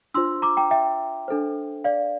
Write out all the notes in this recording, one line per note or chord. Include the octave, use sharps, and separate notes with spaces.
D4 F4 C5 C6 E6
A#5 D6
G5 A#5
E5 G5
D4 A4 C5
D5 F5